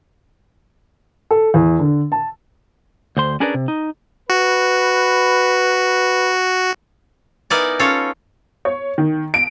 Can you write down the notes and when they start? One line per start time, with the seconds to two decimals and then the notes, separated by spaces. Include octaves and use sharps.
1.31 A4
1.54 E2
1.79 D3
2.12 A5
3.17 D2 C5 C6
3.40 C#4 D4 G#4 A#4 B4 D5
3.54 C3
3.68 D#4
4.30 F#4 B4
7.50 B3 D#4 E4 A#4 D5 G#5
7.79 C#4 F4 A4 C#5
8.65 C#5
8.98 D#3
9.34 D7